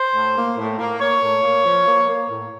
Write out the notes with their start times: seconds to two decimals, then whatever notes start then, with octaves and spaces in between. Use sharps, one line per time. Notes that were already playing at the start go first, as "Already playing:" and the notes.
Already playing: C5
0.14 A2
0.36 A#3
0.57 A2
0.79 A#3
1.00 A#3 C#5
1.22 A2
1.43 A#3
1.65 F3
1.87 A#3
2.08 A#3
2.29 A2